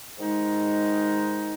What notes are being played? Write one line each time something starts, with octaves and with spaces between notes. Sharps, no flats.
G#2 D#3 G#3 D#4